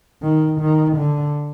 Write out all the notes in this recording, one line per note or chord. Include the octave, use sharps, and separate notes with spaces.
D#3
D#3
D3